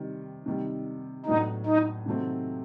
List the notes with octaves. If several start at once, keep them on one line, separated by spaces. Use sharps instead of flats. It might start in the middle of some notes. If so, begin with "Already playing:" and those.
Already playing: C3 D#3 G3 C4
C3 D#3 G3
A2 F#3 B3 D4 D#4
D#4
C3 D#3 F#3 A3 C4